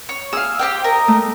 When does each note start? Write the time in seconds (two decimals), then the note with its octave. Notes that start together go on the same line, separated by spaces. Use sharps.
0.09 C#5
0.33 G#4 F5 E6
0.59 G4 C5 G5
0.84 A#4 D#5
1.08 A3